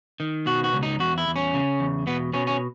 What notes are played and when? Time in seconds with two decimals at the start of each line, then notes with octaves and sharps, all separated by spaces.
0.20 D#3
0.46 B2 F#4
0.64 F#4
0.73 C#2
0.83 D#4
1.00 E2 F#4
1.18 E4
1.27 E2
1.36 C#4
1.54 C#3
1.80 E2
2.07 B2 B3
2.33 B2 C#4
2.47 C#4